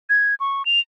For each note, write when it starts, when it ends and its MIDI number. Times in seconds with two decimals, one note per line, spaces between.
0.10 0.35 92
0.40 0.65 85
0.66 0.80 101